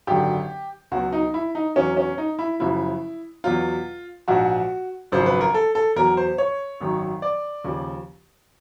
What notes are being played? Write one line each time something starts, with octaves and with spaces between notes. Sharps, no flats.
G#1 F#2 D3 G4
C#2 B2 F#3 F#4
D#4
E4
D#4
E2 B2 F#3 C#4
C#4
D#4
E4
F#1 F#2 C#3 F3 E4
E2 B2 F#3 F4
A#1 G#2 F3 F#4
G#1 F#2 C#3 F3 C5
B4
A#4
A4
A4
E2 B2 F#3 A#4
C5
C#5
G#1 F#2 D#3
D5
D#2 C#3 F3